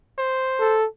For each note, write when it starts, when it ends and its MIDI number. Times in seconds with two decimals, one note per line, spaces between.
0.18 0.78 72
0.60 0.86 69